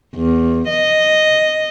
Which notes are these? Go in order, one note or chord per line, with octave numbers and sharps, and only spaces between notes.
E2
D#5